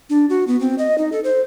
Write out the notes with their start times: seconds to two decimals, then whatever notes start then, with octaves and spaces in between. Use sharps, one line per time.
0.10 D4
0.30 F#4
0.48 B3
0.60 C4
0.78 D#5
0.98 D#4
1.12 A4
1.24 C5